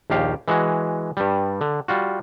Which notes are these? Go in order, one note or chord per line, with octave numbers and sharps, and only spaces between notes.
A#1 D#2 G4 F5
E3 G#3 F#4
G2 G3
D3
G3 F4 F#4